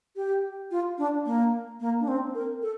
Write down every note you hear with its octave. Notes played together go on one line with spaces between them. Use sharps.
G4
F4
D4
A#3
A#3
D4
C4
A#4
A4